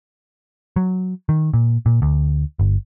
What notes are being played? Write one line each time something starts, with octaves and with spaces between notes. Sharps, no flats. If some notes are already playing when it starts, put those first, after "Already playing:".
F#3
D#3
A#2
A#2
D2
G1